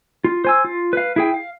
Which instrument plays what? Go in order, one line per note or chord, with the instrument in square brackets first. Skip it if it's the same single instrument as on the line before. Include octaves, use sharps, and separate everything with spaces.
[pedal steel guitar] F4
C5 G#5 E6
F4
B4 F5
E4 G#4 G5
F5